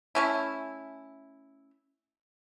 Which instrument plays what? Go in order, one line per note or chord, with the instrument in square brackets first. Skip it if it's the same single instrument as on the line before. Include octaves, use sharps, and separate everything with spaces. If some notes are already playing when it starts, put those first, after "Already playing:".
[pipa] A3 C#4 E4